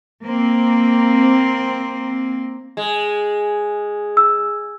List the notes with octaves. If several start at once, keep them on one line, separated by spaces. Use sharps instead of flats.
A#3 C4
G#3
E6